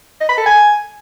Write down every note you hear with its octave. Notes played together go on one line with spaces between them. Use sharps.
D#5
B5
A4
G#5